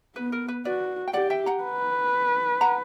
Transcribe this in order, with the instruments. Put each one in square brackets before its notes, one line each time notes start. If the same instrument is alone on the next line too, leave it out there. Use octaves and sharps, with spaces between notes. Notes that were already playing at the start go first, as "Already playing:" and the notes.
[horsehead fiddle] B3 [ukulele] B4
[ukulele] A#4
B4
[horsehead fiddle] F#4 [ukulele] B4 D5
[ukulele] G5
[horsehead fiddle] G4 [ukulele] D5 F#5
[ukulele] E5 G5
F#5 A#5
[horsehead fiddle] B4
[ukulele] F#5 A#5